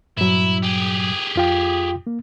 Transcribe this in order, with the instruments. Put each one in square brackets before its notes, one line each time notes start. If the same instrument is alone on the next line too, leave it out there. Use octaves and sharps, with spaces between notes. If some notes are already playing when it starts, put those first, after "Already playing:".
[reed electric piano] G2 A#2 F#3 [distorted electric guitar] E4
[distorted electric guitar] G4 G#4
[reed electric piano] F2 F4 G5
A#3